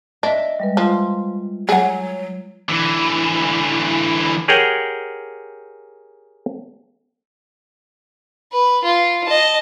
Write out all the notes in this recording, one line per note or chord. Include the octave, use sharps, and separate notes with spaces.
D4 D#5 E5
G3 G#3 B4
F3 F4
F#3 G#4 F#5
D3 E3
G4 G#4 A#4 C#5 F#5 G5
B4
F4
D#5 A5